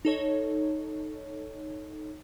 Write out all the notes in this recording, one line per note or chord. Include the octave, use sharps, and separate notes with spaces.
D#4 A4 C#5